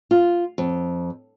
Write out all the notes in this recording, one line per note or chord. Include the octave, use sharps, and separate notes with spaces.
F4
F2